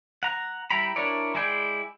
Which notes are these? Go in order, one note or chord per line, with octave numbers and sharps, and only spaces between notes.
F#5 A#5
G3 E4 G5 A#5 B5
D4 E4 A#4 C#5 D5
G#3 E4 G#4 D5 G5